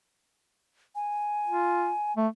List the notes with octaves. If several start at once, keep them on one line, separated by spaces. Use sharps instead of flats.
G#5
F4
A3